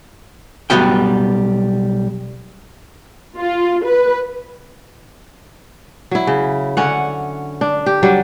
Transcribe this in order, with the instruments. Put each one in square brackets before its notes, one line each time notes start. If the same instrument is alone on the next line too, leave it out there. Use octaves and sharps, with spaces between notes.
[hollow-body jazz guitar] B1 D#3 G3 B3 F#4 G5
[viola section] F4
B4
[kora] F#3 E4
C#3
D3 C#4 F#5
D4
G4
F#3 G3 D4